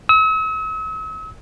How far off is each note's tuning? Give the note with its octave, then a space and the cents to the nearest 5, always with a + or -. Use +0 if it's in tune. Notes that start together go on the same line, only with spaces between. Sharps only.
E6 -45